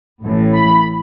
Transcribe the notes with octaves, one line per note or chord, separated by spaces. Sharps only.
A1 A2 E3
B5